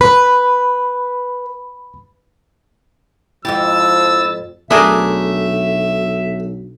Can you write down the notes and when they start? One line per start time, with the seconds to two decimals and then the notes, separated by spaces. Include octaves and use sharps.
0.01 B4 B5
3.45 F2 G#2 F3 E4 G4 E6 A6
4.71 B1 A3 D4 G#4 A#4 E5